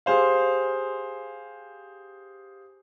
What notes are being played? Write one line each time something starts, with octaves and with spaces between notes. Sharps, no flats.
G4 G#4 C5 F5